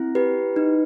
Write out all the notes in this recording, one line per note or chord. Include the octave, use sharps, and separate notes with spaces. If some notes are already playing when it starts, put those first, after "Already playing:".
Already playing: C4 E4
G4 B4
D#4